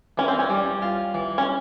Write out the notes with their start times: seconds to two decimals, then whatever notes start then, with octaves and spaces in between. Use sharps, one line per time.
0.18 E3 C#4
0.28 C4
0.39 C#4
0.50 G3
0.82 F4
1.14 E3
1.38 C#4